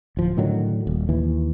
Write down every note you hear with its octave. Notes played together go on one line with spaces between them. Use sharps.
D1 F3
A2 D3 D#3 F#3
D#1
D#2 E3